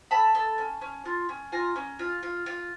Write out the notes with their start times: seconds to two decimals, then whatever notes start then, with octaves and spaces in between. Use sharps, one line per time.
0.11 A4 A5 B5
0.35 A4
0.58 C#4
0.81 C#4
1.05 F4
1.29 C#4
1.52 F4 G#5 A#5
1.76 C#4
1.99 F4
2.23 F4
2.46 F4